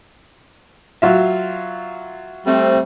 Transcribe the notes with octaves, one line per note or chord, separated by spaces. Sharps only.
F#3 F4 E5
G3 A3 C4